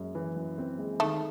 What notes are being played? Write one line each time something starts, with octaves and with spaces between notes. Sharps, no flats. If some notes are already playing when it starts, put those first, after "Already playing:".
Already playing: F#2 G#3
E3
F#2
C4
G#3
D#3 A3